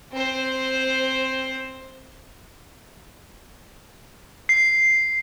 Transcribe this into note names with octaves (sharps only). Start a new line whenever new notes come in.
C4 C5
C7